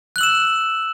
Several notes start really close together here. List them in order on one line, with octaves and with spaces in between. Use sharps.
F#6 F#7 E6 E7